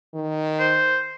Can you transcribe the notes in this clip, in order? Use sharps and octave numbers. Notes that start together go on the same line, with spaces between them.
D#3
C5